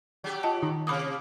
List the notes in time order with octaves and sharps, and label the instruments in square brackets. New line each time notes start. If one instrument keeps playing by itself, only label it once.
[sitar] F#3 G4
[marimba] F4 D#5 A5
[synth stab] D#3
[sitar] C3 A#3 [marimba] B5 D6 D#6